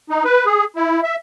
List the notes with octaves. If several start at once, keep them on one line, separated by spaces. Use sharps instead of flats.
D#4
B4
G#4
E4
E5